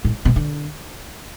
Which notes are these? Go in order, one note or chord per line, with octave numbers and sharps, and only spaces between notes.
A2
B2
D3